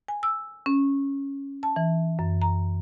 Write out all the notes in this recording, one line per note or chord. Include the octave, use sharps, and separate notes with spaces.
G#5
E6
C#4
A5
E3
F#2
A#5